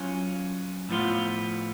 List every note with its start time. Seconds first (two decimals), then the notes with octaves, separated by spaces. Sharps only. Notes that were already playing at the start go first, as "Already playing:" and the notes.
Already playing: F#3 C#4 F4
0.89 A2 F3 B3 F4